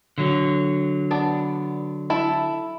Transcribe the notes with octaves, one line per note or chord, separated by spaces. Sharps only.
D3 F#3
B3 D4 D5
E4 A4